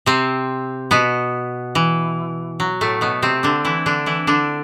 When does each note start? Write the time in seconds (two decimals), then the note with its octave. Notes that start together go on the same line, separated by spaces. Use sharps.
0.06 C3 C4
0.91 B2 B3
1.75 E3
2.60 F#3
2.81 A2 A3
3.01 B2 B3
3.22 C3 C4
3.43 D3 D4
3.65 E3 E4
3.86 D3 D4
4.06 E3 E4
4.27 D3 D4